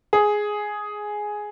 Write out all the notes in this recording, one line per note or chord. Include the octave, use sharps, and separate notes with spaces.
G#4